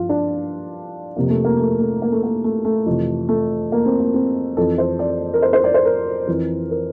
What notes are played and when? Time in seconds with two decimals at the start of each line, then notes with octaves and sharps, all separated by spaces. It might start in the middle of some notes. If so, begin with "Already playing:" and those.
Already playing: G2 F3 F4
0.09 D4
1.16 F2 C3 F3 A#3
1.30 A3
1.44 A#3
1.59 A3
1.80 A3
2.02 A#3
2.12 A3
2.23 A#3
2.44 A3
2.65 A3
2.86 F2 C3 E3
3.29 A3
3.72 A#3
3.86 C4
4.00 A#3
4.14 C4
4.57 F2 E3 A4
4.78 C5
4.99 D5
5.34 A#4
5.42 C5
5.53 C5
5.64 D5
5.74 C5
5.85 A#4
6.27 F2 E3
6.71 A#4